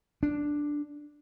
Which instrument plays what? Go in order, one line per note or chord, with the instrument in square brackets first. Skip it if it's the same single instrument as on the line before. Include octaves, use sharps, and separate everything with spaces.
[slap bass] D4